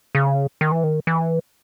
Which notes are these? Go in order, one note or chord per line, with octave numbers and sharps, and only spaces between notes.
C#3
D#3
E3
D#3
E3